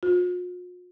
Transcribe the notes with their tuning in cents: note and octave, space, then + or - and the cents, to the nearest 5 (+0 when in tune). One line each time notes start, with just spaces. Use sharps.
F4 +45